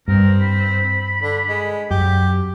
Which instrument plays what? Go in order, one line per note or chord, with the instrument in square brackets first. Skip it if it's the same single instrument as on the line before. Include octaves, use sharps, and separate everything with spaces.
[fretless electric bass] G2 [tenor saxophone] C4 [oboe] A#4
[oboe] B5
[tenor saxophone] D3
G#3
[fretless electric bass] F#2 [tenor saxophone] G4